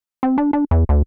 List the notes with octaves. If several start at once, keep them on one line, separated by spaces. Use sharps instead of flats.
C4
D4
D4
E2
D2